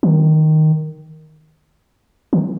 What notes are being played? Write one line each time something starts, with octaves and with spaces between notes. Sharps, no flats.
D#3
D#3